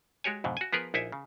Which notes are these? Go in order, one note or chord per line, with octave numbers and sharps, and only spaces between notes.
G#3 F#4 G4 C#5 G#5
F2 G#2 B2 D3
F#4 G#5
F3 B3 G#4 A#4 B4
A#1 D#4 E4 E5 G#5
C#3